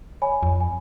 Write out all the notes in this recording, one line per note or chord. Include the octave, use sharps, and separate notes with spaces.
C#5 G#5 B5
F2
G#5